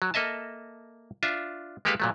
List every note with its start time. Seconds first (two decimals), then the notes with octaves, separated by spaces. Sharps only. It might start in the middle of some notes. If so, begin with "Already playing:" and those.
0.02 F#3
0.14 A#3 A4 D#5 E5 A5
1.23 D4 F4 E5
1.85 G#3 A#3 G4 A4 B4 F5
2.00 A#2 F#3 A3